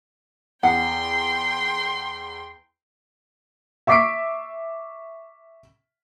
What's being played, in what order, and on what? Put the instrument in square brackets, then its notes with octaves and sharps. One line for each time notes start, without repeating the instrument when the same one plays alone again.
[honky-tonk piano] E2 [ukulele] F#5 [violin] G5 C6
[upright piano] E5 C#6 D6 B6 C7 D7